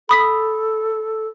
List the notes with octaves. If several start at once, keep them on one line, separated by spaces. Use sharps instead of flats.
A4 B5 D#6 B6